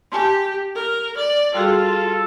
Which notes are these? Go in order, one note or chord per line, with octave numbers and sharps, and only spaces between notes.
G4 G#5 A5 C6
A#4
D5
G3 F4 F#4 G#4 A4